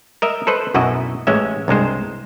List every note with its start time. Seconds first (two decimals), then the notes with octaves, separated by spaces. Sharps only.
0.22 A#4 D#5 E5
0.47 A4 B4 C5 D#5
0.74 B1 F#2 E4 F#4 D#5
1.27 A1 G#3 C#4 E5
1.68 C2 G2 G#3 C5